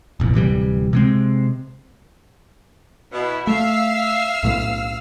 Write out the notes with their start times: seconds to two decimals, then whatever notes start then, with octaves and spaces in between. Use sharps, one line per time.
0.20 F1 A#1 E2
0.34 D1 C3 E3 G3
0.93 C3 G#3 C4
3.13 B2 E4
3.47 A3 E5 F5 E6 F6
4.43 B1 A2 B3